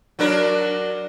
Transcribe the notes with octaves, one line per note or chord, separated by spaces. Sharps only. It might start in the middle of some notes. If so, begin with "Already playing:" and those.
F#3 D4 A#4